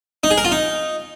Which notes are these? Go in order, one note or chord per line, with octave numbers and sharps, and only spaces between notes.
D#4
G#4
A#4
F4
D#4